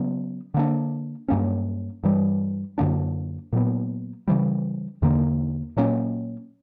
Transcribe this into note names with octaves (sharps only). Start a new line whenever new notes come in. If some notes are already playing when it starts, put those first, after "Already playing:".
Already playing: C#3 F#3 B3
D3 A#3 D4
G2 F#3 A#3 C#4
G2 E3 G3
F#2 D3 A#3 D4
A#2 F#3 B3
C#3 E3 G3
E2 D3 A#3
A#2 F#3 A#3 C#4